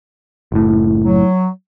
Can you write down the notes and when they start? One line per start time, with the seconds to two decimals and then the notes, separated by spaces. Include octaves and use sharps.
0.52 F#1 A2
1.05 F#3